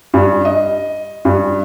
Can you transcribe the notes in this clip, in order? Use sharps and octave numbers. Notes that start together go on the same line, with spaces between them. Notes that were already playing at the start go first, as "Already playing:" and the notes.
G2
D#5
G2